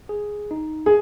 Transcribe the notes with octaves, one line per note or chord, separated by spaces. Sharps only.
G#4
D#4
G#4